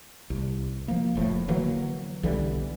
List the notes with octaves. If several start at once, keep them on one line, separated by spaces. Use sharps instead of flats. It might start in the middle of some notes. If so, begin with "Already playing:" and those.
C2
F3 A#3
F1 A2 F3
D3 E3 F#3 A#3
B1 D3 E3 G3